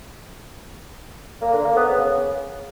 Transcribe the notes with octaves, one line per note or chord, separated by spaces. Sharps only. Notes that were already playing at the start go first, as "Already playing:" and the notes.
A#3
D3
A#3
B3
C#3